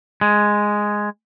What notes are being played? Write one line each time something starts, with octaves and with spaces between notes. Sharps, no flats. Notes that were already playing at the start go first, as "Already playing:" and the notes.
G#3